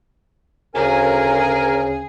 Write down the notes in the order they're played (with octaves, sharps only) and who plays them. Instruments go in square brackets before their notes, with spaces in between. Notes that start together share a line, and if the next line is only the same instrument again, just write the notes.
[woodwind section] D2 C#3 [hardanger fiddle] G#4 [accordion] A#4 G#5